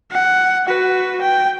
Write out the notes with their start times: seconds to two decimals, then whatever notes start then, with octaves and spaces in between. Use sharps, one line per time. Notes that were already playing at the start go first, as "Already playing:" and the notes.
0.12 F#5
0.65 F#4 B4
1.21 G5